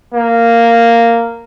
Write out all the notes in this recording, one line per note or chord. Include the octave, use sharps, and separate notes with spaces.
A#3